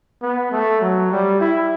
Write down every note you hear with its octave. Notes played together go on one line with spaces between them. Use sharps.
B3
A3
F#3
G3
E4